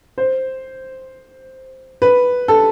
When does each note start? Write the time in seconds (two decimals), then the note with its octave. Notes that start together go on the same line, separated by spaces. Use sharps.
0.18 C5
2.02 B4
2.48 A4